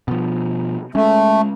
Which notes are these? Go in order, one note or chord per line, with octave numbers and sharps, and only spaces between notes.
B2 F3
G#3 A3 C#4